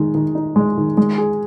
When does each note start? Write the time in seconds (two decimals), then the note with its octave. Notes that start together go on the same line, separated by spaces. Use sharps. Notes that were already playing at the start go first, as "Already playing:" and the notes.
Already playing: D#3 G#3
0.15 D#3
0.35 D#4
0.56 G#3
0.77 D#3
0.97 G#3
1.18 G#4